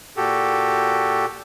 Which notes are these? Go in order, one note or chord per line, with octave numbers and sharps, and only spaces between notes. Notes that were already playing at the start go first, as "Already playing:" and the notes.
A#2 F#4 G4 A4